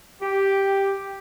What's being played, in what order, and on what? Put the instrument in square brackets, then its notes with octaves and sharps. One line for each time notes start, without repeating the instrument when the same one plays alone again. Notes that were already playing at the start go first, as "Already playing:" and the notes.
[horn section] G4